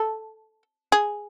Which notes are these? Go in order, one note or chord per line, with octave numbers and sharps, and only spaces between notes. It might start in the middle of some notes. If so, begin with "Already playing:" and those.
Already playing: A4
G#4